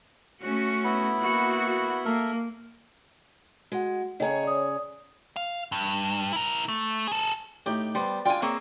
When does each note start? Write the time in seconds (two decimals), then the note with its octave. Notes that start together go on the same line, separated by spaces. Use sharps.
0.43 A3 C#4 F#4
0.85 B3 E4 B5
1.20 A#3 F#4
2.05 A#3 A4 A#4 E5
3.72 G#3 F#4 F#5
4.20 C#3 G#4 C#5 D#5 G5 A#5
4.43 D5 D#6
5.36 F5
5.72 G2
6.33 E4 A#4
6.69 A3
7.08 G#4 A4
7.66 A2 D#4 G4
7.95 G3 B3 C5
8.25 G3 D4 F4 G5 G#5
8.42 A#3 C4 G#4 C#5 E5